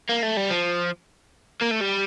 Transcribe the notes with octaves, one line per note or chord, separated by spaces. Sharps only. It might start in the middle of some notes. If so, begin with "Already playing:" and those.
A#3
A3
G3
F3
A#3
A3
G3